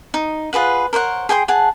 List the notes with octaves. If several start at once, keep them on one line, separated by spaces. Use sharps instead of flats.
D#4
F4 G#4 B4 F#5
A#4 C5 C#5 F#5
G#4 G5 G#5 C6
G#4 F#5 A5